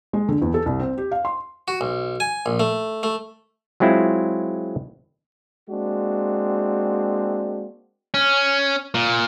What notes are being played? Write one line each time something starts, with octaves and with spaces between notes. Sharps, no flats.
G#3
D3
E2
A4
C2
C4
G4
F5
C6
F#4
B1
G#5
A#1
A3
A3
F#3 G#3 C4 E4 F4
G#3 A#3 C4 D4 F#4
C#4
A#2